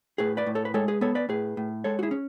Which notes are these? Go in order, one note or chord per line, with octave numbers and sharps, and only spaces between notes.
A2 G#4 B4
B4 D5
A2
A4 C#5
B4
G#3 A4 C#5
G#4 B4
B3 A4 C#5
B4 D5
A2 G#4 B4
A2
G#3 A4 C#5
F#4
E4 G#4
C#4